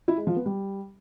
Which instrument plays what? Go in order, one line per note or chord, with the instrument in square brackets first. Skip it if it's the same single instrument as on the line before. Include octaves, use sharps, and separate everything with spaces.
[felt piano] E4
G#3
F3
B3
G3